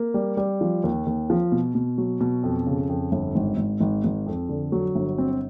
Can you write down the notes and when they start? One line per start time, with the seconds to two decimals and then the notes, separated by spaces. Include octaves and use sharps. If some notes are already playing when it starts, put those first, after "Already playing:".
Already playing: A#3
0.14 G3
0.37 G3
0.61 F3
0.84 D#2
1.06 D#2
1.30 F3
1.52 B2
1.75 B2
1.98 F#3
2.21 B2
2.43 F2
2.67 C#3
2.89 F2
3.12 G1
3.35 G#1
3.57 G#1
3.80 G#1
4.04 G#1
4.27 F2
4.49 D3
4.72 F#3
4.95 G1
5.18 C4